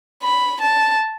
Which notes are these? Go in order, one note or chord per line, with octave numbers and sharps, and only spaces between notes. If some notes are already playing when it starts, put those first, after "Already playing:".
B5
A5